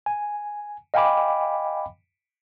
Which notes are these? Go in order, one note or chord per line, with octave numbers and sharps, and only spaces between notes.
G#5
D#5 F5 G5 G#5 B5 D6